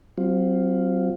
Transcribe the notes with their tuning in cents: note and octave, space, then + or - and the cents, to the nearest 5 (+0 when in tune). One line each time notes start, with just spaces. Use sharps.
F#3 +35 C4 +0 F4 +0